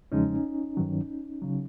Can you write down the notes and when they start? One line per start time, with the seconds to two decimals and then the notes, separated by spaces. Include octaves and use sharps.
0.12 E2 C#3 F3 G#3 C#4 D#4
0.77 G2 D#3 F#3
1.42 C#3 F#3